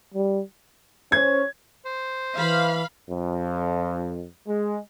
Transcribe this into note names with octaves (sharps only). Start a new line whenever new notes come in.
G3
C#4 C5 C#5 G#6
C5
E3 F5 B5
F2
G#3